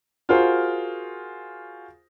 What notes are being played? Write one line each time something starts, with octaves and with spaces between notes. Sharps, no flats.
F4 F#4 G#4 A#4 C5